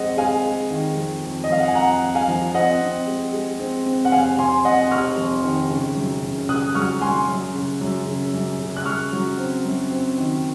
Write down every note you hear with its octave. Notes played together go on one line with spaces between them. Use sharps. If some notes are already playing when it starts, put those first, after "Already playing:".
Already playing: F2 G#3 C4 D#5 F#5
G#3 F5 G#5
G#3
D#3
F2
F2
D#5
F2 F5
F#5
G#5
F2 F#5 A#5
F2
F5 G#5
F3
C4 D#5 F#5
C4
G#3
G#3
C4
C4
F#5
F1 F5 G#5
F1 G#5 C6
F2 D#5 F#5
F1 C#6 F6
F2
D#3
C#3
F#2
C#3
C#3 D#6 F#6
F#3 C#6 F6
F#3 G#5 C6
F#2
C#3
F#2
C#3
F#2
C#3
F#6
F#2 C#6 F6
F#3
C4
F#2
C4
D#3